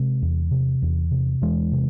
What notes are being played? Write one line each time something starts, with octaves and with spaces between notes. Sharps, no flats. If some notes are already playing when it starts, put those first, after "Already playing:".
Already playing: C3 G#3 C4
E2
C3
E2
C3
E2 E3 G#3
C3